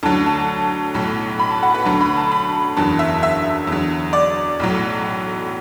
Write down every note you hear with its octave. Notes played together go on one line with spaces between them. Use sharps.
D2 D3 F#3 A5
A5
B1 A2 F#3
B5
A5
F#5
B4
D2 D3 F#3 A5
B5
A5
B5
F#1 E2 D3 F#3 A5
E5
E5
E2 D3 F#3
D5
B1 A2 F#3